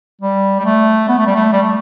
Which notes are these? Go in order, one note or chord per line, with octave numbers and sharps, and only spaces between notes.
G3
G3
A3
B3
A3
G3
A3
G3
A3